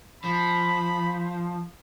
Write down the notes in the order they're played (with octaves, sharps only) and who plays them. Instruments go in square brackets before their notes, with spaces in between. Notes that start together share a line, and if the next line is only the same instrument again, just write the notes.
[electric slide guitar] F3 [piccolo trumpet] B5